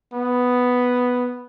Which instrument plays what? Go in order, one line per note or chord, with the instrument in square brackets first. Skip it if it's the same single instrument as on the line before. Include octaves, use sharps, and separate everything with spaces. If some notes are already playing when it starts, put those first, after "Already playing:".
[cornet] B3